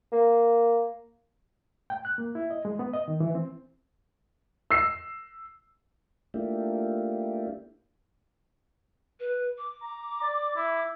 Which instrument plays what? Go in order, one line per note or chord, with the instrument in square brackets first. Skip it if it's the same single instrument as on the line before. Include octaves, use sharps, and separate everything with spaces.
[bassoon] A#3
[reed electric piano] G5
F#6
A#3
E4
D#5
G#3
B3
D#5
D#3
E3
C4
[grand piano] E6 C7
[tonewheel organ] A3 A#3 D4 E4 F4 G4
[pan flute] B4
D6
[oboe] A#5
D5
E4